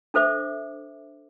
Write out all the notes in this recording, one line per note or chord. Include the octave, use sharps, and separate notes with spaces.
D4 A4 C5 E5 D6